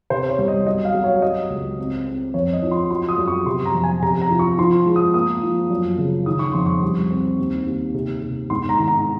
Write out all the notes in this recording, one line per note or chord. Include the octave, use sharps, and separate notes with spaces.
C3 C5
C#5
C2
D#5
F#3 D#5
F5
F#3
C#5
F#3 D#5
C#2
C4
C4
F2 C#5
D#5
F3
C6
F#3 C6
D#6
F#2
C#6
C3 C6
A#5
F2
G#5
C3 A#5
A#5
F3
C#6
F3 C6
G#3
D#6
A#3 D#6
F3
F#2
C#3
D#3 D#6
C#6
F2 C6
C#6
C2
C4
D#2
D#2
C3
C3
G#2 C6
A#5
D#3
A#5